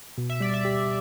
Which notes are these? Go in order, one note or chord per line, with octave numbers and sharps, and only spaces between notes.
B2
E5
G3 D5
E5
G4